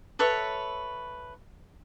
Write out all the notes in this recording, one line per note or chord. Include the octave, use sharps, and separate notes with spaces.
A4 B4 C#5 E5